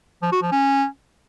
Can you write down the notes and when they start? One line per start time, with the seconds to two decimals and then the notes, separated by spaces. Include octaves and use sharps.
0.22 F3
0.32 F#4
0.42 F3
0.52 C#4